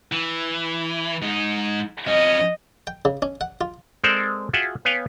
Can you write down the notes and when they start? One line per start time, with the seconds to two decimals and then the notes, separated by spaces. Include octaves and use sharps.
0.12 E3
1.22 G#2 D#4
2.08 F2 C#4 D#5
2.87 G5
3.05 C#3
3.22 C#4
3.41 F#5
3.61 F4
4.04 G#3 C4 A4 A#4 C5 D5
4.53 F4 F#4 G#4 E5 F#5 G5
4.85 B3 B4 C#5 F5 G5 G#5